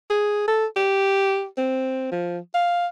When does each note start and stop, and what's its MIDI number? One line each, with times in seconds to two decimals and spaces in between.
0.10 0.47 68
0.48 0.66 69
0.76 1.46 67
1.58 2.09 60
2.12 2.38 53
2.54 2.87 77